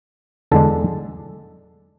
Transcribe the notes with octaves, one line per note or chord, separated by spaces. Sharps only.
E2 D3 G#3 D4 A4